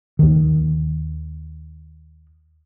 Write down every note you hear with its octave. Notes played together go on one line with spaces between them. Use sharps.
D#2 D#3